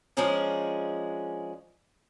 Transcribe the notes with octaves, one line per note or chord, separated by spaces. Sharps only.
F3 G#3 C#4 D4 G#4 A#4